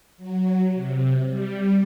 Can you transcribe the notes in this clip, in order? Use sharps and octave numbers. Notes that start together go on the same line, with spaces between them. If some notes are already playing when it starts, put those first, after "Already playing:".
F#3
C3
G3